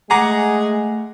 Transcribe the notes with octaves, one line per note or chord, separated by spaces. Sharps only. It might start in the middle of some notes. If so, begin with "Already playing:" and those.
G#3 A3 G#4 F#5 A#5 D6